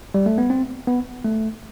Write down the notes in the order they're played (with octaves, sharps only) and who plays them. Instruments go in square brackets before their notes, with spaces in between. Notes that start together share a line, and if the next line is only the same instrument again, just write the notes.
[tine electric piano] G3
A3
B3
C4
B3
A3